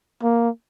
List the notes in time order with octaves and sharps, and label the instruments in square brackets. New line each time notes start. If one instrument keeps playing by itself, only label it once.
[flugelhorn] A#3